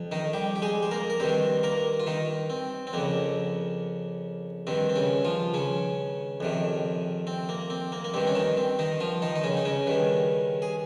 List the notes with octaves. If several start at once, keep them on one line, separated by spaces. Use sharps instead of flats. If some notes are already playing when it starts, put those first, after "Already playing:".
Already playing: F2
D#3 D#4
G3 G4
G4
G#3 G#4
C5
A#3 A#4
A#4
G2 D#3 C4 C5
A#3 A#4
F4
D#3 D#4
C4
C4
F2 C#3 A#3
G2 D#3 C4
C4
C#3 C#4
F3 F4
C#3 C#4
F2 C3 D#3
C4
A#3
C4
A#3
A#3
G2 D#3 C4
C#4
D#3 D#4
C4
D#3 D#4
F3 F4
D#3 D#4
D#4
C#3 C#4
D#4
C#3 C#4
G2 D#3
G#4